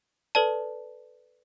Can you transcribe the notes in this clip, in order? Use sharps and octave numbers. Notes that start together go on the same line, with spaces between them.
A4 B4 D5 A5